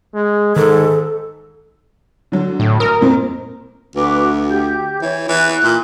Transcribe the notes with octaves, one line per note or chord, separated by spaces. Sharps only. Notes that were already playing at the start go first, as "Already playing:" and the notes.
G#3
G#2 D#3 A4
D3 F#3
A2
A#4 D#6
F2 A#2 C4
D2 F#4 B4 D6
G4 G6
E3 C#5
E3 F#6
A#2